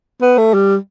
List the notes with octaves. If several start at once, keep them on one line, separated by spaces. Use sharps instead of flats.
B3
A3
G3